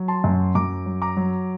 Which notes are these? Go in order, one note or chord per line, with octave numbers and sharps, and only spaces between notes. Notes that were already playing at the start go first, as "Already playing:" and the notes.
Already playing: F#3
A5 C6
F#2
F#2 A#5 D6
F#3
A#5 D6
F#3